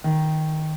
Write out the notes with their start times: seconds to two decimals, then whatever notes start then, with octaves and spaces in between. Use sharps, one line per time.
0.04 D#3